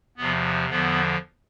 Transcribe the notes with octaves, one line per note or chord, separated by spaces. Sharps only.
E2 C3 F3 B3
E2 D3 F3 B3